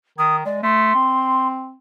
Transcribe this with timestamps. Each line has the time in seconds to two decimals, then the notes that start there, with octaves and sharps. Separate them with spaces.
0.18 D#3 D#6
0.45 G#3 D5
0.63 A3 C6
0.95 C4